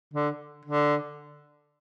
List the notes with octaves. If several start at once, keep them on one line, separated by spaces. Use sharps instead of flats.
D3
D3